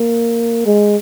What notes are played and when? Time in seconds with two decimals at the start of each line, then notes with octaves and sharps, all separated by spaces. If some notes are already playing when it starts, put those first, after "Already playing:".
Already playing: A#3
0.66 G#3